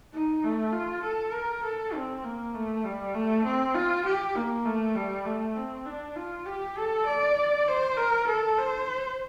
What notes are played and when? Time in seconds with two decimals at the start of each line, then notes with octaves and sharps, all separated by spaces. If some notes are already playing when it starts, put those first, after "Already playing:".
0.13 D#4
0.43 A3
0.73 F4
1.03 A4
1.33 A#4
1.64 A4
1.94 C4
2.24 A#3
2.54 A3
2.84 G3
3.14 A3
3.45 C4
3.75 F4
4.05 G4
4.35 A#3
4.65 A3
4.95 G3
5.25 A3
5.57 C4
5.86 D4
6.16 F4
6.46 G4
6.77 A4
7.06 D5
7.68 C5
7.97 A#4
8.27 A4
8.58 C5